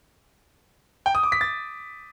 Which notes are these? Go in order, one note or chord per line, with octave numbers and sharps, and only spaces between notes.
G5
D#6
D6
B6
A6